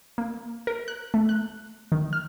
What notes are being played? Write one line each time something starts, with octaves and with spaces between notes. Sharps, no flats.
A#3
A#4
F#6
A3
F#6
D#3
F6